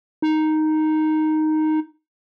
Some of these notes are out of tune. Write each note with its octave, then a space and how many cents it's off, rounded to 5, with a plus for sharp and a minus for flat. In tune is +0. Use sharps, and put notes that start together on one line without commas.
D#4 +0